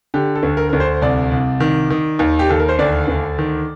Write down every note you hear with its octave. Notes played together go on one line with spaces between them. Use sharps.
D3 G4
A4
D2
A#4
D2 A#4
C5
C2 D5
C2
D#3
D#3
D#2
G4
D#2 A4
A#4
C5
D2 D5
D2
D#3